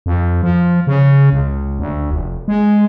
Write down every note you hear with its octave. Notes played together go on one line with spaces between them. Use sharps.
F2
F3
C#3
C#2
D2
F1
G#3